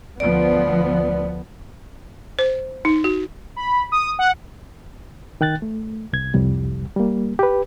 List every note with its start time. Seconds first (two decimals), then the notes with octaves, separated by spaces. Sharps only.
0.20 D2 F3 B3 D5
2.39 C5
2.85 D#4
3.04 F#4
3.56 B5
3.92 D#6
4.19 F#5
5.41 D#3 G5 F#6 A6
5.62 A3
6.13 C2 G#6
6.34 C2 F2 G3
6.96 G3 A#3
7.39 G4 B4